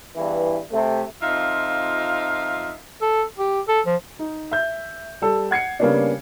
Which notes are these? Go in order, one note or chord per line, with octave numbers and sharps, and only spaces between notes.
E2 G2 E3
C3 A3
F2 D#4 F4 E5 F5
A4
G4
A4
F3
D#4
E5 G6
G3 A4
F#5 G#6 C7 C#7
C#3 G3 A#3 B3 C#4 D4